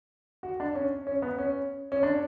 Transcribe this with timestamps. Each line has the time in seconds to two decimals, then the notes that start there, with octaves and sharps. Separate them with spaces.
0.43 F#4
0.60 D4
0.75 C#4
1.07 C#4
1.22 B3
1.38 C#4
1.92 C#4
2.03 D4